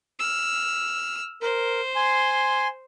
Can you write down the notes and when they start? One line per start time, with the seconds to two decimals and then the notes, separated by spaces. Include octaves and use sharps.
0.19 E6 F6
1.42 A#4 C5
1.96 G#5 C6